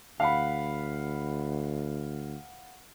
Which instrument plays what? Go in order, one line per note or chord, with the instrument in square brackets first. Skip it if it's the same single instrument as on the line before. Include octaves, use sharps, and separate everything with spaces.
[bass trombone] D2 [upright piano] F5 F#5 B5